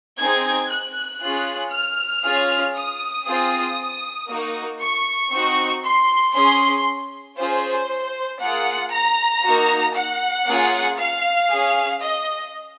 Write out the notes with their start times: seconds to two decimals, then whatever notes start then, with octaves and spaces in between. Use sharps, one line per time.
0.17 C4 D#4 G#4 G#6
0.69 F#6
1.20 C#4 F4 G#4
1.71 F6
2.23 C#4 F4 G#4
2.75 D#6
3.26 C4 F4 G#4
4.28 A#3 D#4 F#4
4.80 C#6
5.31 C4 D#4 F#4
5.83 C6
6.34 C#4 G#4 C6
7.37 C#4 F4 G#4 C5
8.40 A#3 F4 G#4 F#5
8.91 A#5
9.43 A#3 D#4 F#4
9.94 F#5
10.46 A#3 C#4 F4 G#4
10.97 F5
11.48 C#4 G#4
12.00 D#5